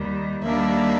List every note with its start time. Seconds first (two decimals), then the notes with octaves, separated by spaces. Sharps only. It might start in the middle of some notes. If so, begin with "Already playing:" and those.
Already playing: D#2 D#3 G3
0.45 D#2 D#3 G3 A#3 D4 E5